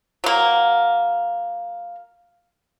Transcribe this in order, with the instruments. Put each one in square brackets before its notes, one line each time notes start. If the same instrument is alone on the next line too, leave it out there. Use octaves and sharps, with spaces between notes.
[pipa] F#3 A#3